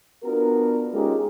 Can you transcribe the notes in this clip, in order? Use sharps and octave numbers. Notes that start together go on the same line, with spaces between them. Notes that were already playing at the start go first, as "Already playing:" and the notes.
B3 D4 F4 F#4 A#4
G#3 C#4 D#4 F4 G4 G#4